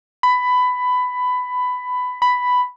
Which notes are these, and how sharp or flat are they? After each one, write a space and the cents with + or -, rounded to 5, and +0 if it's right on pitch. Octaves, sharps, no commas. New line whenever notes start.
B5 +15
B5 +5